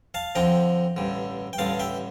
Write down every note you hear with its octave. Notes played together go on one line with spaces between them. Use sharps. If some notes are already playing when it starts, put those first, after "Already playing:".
F5 A5
F2 D3 F3 G5 A#5
A1 G2 D3
G5
A1 G2 D3 F5 A5
E5 G5